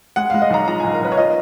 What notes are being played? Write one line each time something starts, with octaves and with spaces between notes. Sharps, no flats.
G#3 F#5
G#3 F5
D#5
B1 A#5
F3 A#5
B1 G#5
A#4
B1 B4
C#5
F4 D#5